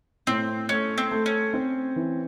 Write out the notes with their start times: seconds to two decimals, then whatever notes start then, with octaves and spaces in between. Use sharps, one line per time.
0.27 A2 C4
0.69 A3 C#4
0.98 C4
1.11 A3
1.26 C#4
1.53 C4
1.96 E3